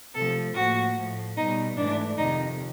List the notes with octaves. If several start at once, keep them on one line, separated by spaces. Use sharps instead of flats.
C3 F3 A3 A4
A2 F3 A#3 F#4
A2 F3 A3
B2 G3 B3 D#4
G#2 E3 A3 D4
F2 C3 D#3 D#4